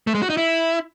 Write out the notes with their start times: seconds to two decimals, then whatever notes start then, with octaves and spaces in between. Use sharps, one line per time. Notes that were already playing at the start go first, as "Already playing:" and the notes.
0.07 A3
0.15 G#3
0.22 F#4
0.30 D#4
0.37 E4